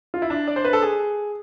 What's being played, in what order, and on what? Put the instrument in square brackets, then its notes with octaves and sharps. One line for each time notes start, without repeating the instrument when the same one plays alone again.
[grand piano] F4
E4
D4
D5
C5
B4
A4
G#4